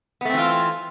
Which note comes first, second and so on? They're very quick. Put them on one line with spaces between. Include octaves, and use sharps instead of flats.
B3 A3 C4 E3 F4